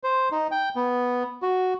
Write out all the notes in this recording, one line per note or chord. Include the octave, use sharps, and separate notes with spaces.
C5
D#4
G5
B3
F#4